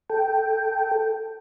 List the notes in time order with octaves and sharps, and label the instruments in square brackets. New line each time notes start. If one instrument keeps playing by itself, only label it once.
[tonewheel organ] A4 G5